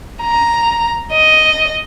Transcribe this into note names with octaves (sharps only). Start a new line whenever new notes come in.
A#5
D#5